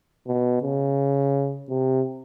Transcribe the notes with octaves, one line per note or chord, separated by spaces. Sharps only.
B2
C#3
C3